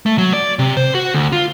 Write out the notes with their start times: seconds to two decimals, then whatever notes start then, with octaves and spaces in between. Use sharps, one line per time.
0.06 A3
0.18 F#3
0.33 D5
0.59 C3
0.77 C5
0.95 F#4
1.14 D2
1.32 F4